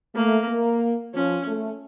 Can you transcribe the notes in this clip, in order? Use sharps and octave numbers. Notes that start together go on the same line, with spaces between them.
A3 A#3
A#3
F3 C#4
A3